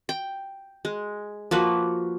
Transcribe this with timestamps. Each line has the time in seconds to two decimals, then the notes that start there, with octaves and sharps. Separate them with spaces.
0.09 G5
0.85 G#3
1.51 F3 A#3 F#4 B4